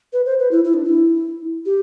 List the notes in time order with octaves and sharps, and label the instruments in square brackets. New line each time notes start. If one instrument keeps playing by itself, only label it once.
[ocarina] B4
C5
B4
E4
E4
D4
E4
G4